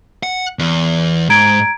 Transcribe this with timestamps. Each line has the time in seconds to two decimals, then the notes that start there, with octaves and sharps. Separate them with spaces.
0.23 F#5
0.59 E2
1.30 G#2 A#5 G#6 D7